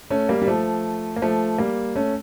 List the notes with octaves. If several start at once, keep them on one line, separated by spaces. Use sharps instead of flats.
A3 C#4
G3 A#3
G3
F3 A3
A#3
F3 A3
G3 A#3
A3 C#4